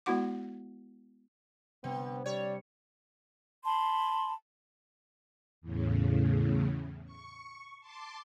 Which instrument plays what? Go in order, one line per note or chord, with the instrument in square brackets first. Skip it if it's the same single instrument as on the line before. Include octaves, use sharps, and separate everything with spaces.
[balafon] G#3 B3 E4 F#4 F#5 D6
[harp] C3 G3 D4 [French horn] B3 [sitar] C4
[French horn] G3 [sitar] C#5 [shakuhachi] D5 [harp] C#6 B6
[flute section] A5 B5 C6
[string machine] E2 A2 C#3
C#6
A5 C6 D6